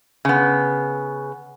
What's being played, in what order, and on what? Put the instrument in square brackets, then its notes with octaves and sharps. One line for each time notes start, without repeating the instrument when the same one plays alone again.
[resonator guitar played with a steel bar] C#3 B3